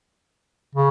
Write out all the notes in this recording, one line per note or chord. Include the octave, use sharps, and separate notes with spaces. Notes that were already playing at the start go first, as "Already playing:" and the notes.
C#3